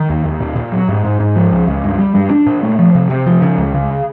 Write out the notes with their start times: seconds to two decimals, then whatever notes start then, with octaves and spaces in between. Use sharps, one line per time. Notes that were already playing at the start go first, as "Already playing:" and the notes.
Already playing: D#3
0.09 D#2
0.25 D#2
0.40 A#2
0.56 A#2
0.72 F#3
0.89 G#2
1.05 G#2
1.20 G#2
1.36 F3
1.52 C#2
1.67 C#2
1.84 G2
1.99 G3
2.15 G2
2.30 D4
2.46 A#2
2.63 A3
2.79 F3
2.95 C3
3.10 C3
3.26 F3
3.42 C#3
3.58 C#2
3.74 C#3